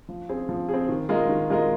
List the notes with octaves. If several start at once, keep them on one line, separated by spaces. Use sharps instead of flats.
F3
C4 G#4
F3
C4 G#4
D#3
G#3 F4 A#4 D#5
D#3
G#3 F4 A#4 D#5